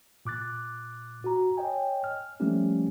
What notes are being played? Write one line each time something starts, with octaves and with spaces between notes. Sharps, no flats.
A#2 D6 F#6 A6
F#4 A#5
C#5 D#5 G5 G#5
F6
F3 G3 A3 A#3 C#4 G4